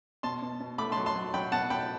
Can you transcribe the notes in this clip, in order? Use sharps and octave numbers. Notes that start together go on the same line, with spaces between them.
B2 A5 C6
B2
B2
A3 B5 D6
F#3 A5 C6
A5 C6
F#3
F#3 G5 B5
B2 F#5 A5
B2 G5 B5